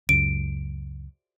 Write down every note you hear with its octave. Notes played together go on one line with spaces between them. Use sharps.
C#2 F#2 D7